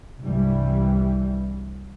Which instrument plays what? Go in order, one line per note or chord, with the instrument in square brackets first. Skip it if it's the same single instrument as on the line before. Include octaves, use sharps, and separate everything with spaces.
[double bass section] C2 G2 E3 G3